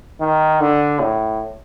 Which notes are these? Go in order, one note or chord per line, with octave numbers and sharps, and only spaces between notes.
D#3
D3
A2